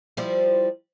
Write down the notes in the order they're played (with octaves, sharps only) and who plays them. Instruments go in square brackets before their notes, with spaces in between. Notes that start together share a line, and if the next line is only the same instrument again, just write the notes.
[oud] F3 G3 E4